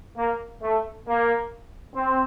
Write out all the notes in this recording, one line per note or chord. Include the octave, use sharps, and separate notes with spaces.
A#3
A3
A#3
C4